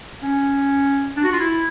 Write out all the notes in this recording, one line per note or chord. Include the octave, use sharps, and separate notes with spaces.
C#4
D4
F#4
F4
E4